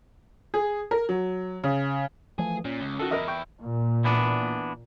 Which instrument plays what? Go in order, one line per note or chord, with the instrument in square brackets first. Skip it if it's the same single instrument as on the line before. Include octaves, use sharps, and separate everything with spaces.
[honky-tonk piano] G#4
A#4
F#3
C#3
[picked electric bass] E3 F3 A3 [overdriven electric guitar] G#4
[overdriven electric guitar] A#2 [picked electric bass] C#4
[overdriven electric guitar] C#2
[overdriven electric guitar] D#3 [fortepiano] F#4 A4
[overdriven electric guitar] E2 E4 [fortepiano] A#4 D#5 E5
[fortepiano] G5 C#6
[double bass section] A#2
[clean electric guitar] E3 B3 D4